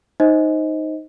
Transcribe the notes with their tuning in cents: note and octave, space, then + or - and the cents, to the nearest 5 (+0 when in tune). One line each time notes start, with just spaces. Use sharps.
D#4 +0 C5 +10 D#5 +25